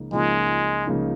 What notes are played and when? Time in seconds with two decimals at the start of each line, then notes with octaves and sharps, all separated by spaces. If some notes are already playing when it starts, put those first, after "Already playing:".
Already playing: C#2 C#3 F3 A#3 D#4
0.12 C#2 C#3 F3 G#3 A#3 D#4
0.86 C#2 C#3 F3 A#3 D#4